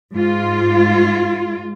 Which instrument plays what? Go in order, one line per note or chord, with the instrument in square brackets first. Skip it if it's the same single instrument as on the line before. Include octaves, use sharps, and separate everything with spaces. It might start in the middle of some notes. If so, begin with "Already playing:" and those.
[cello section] G#2 F4